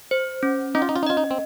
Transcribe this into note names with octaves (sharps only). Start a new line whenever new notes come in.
C5
C#4
C#4 D#4
F4
D#4
F4
D#4
F4 D#5
D#4
C4